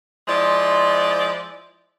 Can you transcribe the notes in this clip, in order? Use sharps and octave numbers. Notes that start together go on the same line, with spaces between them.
F3 G#3 E4 D5